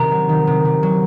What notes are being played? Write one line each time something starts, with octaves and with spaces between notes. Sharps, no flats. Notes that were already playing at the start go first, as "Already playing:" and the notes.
Already playing: C3 D#3 A#5
F#3
D#3
C3
C3
F#3